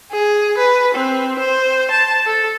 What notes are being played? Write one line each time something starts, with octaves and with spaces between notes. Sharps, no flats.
G#4
B4
C4
C5
A5
A4